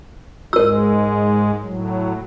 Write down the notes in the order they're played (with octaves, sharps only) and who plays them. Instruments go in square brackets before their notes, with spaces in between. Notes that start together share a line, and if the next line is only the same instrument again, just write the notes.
[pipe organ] G#2 G#3 [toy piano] A#4 E6
[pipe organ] A2 F#3